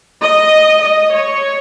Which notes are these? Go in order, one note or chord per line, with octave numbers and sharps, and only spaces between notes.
D#5
D#5
C#5